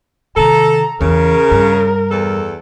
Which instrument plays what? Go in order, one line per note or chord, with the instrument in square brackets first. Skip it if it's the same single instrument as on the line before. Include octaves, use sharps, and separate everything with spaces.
[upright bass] C3 D#3 [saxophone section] A4 [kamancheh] A#5
[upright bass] E2 E3 [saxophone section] C#3 [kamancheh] A#4
[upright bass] G2
[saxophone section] E2 A4